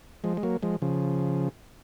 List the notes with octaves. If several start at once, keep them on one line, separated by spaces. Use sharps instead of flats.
F3 G#3
G#3
F#3 A#3
F3 G#3
C#3 F3